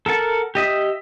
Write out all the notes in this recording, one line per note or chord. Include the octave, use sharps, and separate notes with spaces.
A4 A#4 F#5 A5
G4 D#5 E5 D#6